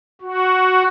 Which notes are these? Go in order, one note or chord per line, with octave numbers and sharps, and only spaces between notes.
F#4